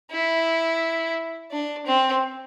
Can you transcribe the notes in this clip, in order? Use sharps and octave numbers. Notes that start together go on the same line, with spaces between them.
E4
D4
C4